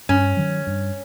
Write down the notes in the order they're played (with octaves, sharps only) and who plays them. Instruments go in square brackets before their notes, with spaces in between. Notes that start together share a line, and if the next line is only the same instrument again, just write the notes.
[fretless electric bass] G2 [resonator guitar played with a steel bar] C#4
[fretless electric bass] D#3 F#3
G2